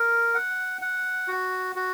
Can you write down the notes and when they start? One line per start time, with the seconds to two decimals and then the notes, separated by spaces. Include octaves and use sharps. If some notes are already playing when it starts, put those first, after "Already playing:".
Already playing: A#4
0.35 F#5
0.82 F#5
1.28 F#4
1.76 F#4